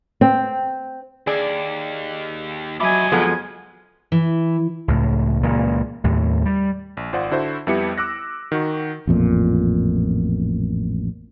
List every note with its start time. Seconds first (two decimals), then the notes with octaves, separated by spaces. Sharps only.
0.21 C4
1.27 D#2 G#4 D5
2.80 F#3 A3 D#5 E5 G#5 B5 D6
3.12 F2 F3 G#3 B3 A4 F#5
4.12 E3
4.88 C#2 A2
5.43 C#2 A#2 C#3 E3
6.04 D#2 A2
6.45 G3
6.97 A#1
7.13 G#1 F4 C5 D5 F#5
7.31 D3 E4 F#4 C5
7.67 F2 G3 B3 E4 G4 C#7
7.98 D6 E6 F#6 A#6
8.52 D#3 F#4
9.07 A1 F2 A#2